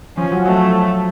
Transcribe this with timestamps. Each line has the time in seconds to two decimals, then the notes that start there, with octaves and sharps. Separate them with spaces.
0.17 F3 C#4
0.32 F#3
0.45 F#3 A3